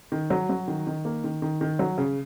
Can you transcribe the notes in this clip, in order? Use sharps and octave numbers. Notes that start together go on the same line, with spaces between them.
D#3
F#3
F#3
D#3
D#3
A#3
D#3
D#3
D#3
F#3
C#3